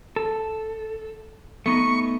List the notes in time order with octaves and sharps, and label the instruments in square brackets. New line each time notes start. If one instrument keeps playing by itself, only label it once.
[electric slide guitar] A4
[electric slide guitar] A3 B3 D#4 [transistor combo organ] C#6